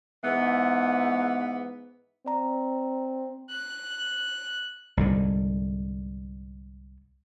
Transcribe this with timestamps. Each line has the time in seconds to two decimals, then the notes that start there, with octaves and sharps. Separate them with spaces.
0.24 G#2 E3 B3
2.26 C4 D5 A#5
3.51 F#6
4.97 C2 G#2 D3